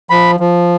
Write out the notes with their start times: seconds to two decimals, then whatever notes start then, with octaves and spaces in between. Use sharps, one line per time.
0.10 F3 B5
0.40 F3